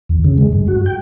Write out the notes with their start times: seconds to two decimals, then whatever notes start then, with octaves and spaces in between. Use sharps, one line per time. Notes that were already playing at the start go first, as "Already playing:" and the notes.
0.09 E2
0.24 C#3
0.38 G#3
0.53 G2
0.68 F#4
0.86 G5